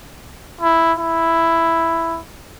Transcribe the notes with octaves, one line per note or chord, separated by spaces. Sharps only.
E4
E4